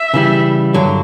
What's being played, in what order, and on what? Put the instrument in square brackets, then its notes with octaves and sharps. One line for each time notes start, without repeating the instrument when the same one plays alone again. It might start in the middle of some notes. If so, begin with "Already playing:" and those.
Already playing: [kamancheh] E5
[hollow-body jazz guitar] C#3 E3 G3
G2 D3 F#3